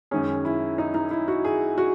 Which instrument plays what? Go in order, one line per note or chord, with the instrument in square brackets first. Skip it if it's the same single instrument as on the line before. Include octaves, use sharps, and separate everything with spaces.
[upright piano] F#2 D#3 G#3 C#4 G#4
E4
D#4
D#4
E4
F#4
G#4
F#4